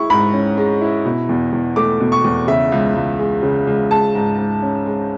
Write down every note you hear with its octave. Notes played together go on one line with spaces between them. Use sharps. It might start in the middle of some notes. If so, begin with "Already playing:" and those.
Already playing: G#3 E4 C#6
G#2 B5
C#4
G#3
E4
B2
E2
E2
A3 D6
B2
C#6
E2
C#3 E5
C#2
C#2
G#3
C#3
C#2
G#3 A5
G#2
G#2
C#4
G#3